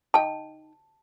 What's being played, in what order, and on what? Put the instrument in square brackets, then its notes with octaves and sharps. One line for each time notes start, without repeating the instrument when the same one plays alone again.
[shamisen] D#4 G5 [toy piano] A5